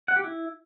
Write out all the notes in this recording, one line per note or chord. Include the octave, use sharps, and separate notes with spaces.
F#5
G4
E4